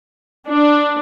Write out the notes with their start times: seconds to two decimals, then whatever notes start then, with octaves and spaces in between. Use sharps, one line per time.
0.46 D4